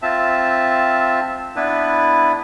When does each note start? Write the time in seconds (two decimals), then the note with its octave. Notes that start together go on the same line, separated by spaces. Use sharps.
0.02 C4 F4 E5 A5
1.56 B3 D4 E4 B4